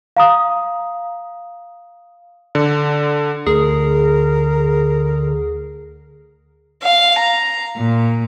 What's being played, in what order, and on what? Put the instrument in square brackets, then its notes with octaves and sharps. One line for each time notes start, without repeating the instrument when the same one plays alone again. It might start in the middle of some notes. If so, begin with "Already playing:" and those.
[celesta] F5 A#5 D#6
[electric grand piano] D3
[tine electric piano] D2 [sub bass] D3 [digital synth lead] G#4 [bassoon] A#4
[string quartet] F5
A#5
A#2